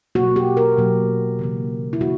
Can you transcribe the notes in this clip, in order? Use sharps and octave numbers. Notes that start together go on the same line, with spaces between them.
B2 F#3 A#3 F#4
G4
A#4
B2 F#3 A#3
C#3 E3 A#3
E4
C#3 E3 A#3 F#4